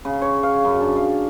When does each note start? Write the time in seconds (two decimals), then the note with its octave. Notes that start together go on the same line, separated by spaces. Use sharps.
0.05 C#3
0.22 C#5
0.43 F5
0.65 F#2
0.80 D4
0.96 F5